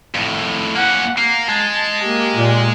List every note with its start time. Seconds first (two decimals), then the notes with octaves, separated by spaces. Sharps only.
0.15 F2 A2
0.76 A#3 C#4 F#5
1.18 A#3 C7
1.49 G#3 A5
2.04 A#3 G4
2.35 A#2